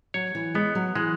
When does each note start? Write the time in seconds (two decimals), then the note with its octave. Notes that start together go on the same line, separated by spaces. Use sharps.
0.14 F#3 C#5
0.35 E3
0.55 G#3 B3
0.75 F#3
0.95 E3 G#3